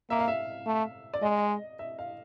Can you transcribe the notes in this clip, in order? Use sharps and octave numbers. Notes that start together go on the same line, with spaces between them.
A#3 E5
F5
E5
A3
D5
G#3 D#5
E5
F5